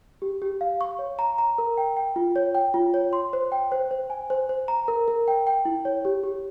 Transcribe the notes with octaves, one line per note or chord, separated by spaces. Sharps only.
G4
G4
F5
C#6
C#5
A#5
A#5
A#4
G5
G5
F4
C#5
G5
F4
C#5
C6
C5
G5
C5
C5
G#5
C5
C5
A#5
A#4
A#4
G5
G5
E4
C#5
G4
G4